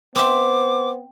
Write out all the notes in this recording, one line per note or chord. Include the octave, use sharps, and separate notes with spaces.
B3 C4 C5 E5 D6